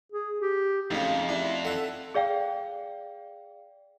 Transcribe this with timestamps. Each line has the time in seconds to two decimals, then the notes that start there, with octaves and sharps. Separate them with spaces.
0.12 G#4
0.40 G4
0.91 F2 A2 C#3 D#4
1.29 D4 E4
1.65 A4 E5 F#5
2.15 G#4 D5 F5 G5